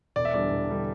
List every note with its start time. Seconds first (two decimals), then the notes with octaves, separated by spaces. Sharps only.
0.16 E1 D5
0.25 E5
0.34 E2 D3 G3 D4 D5
0.51 E1
0.69 D3 G3 D4